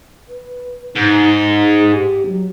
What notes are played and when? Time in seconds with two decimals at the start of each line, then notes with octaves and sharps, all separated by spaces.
0.29 B4
0.95 G#2 D#4
1.47 G#4
1.92 G4
2.26 F#3